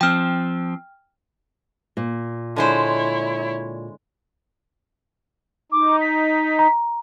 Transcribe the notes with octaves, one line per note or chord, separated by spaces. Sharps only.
F3 C4 G5 F6
A#2
D3 G#3 E4 C5 C#5
D#4 D6
B6
A#5